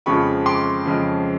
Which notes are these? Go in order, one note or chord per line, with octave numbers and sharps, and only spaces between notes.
F2 C#3 F3 G#3 B5 C#6
C6 D6
F2 C#3 F3 G#3